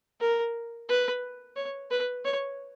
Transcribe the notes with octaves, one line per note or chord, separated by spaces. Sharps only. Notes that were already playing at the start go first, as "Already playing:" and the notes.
A#4
B4
C#5
B4
C#5